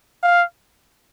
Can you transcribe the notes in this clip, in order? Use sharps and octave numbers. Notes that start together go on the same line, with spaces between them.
F5